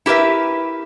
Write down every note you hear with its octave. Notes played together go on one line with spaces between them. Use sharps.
E4 G4 A#4 B4 E5